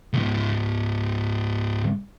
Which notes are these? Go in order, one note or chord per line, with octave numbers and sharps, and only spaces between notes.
C#2 G#2